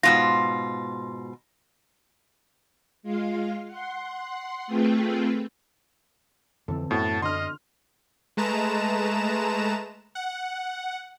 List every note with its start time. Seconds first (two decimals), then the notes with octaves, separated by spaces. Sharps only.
0.03 G#2 B2 F4 A#6
3.03 G#3 F4 F5
3.67 F#5 C6
4.67 A3 C4 F4 G#4 B4 G5
6.68 F2 D3 E3 C4 A4
6.91 F#2 A2 B3 C4 F#4 A5
7.22 D3 D#5 C6 F6
8.37 G#3 A3 B4 A5 A#5 E7
10.15 F#5